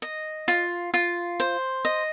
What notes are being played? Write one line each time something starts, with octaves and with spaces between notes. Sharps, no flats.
D#5
F4
F4
C5
D#5